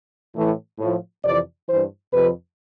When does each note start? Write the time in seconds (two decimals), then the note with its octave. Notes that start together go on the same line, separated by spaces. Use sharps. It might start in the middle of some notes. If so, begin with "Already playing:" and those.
0.35 A2 E3
0.79 A2 F3
1.23 F2 C3 E3 D5
1.68 G2 E3 C5
2.12 F2 C3 F3 B4